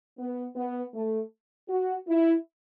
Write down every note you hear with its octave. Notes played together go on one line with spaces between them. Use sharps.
B3
B3
A3
F#4
E4